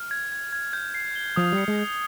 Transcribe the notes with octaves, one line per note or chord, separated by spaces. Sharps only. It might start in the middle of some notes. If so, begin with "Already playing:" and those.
Already playing: F6
G#6
G#6
G#6
G6
C7
G7
F3 D#6
G3
C#7
G#3
G6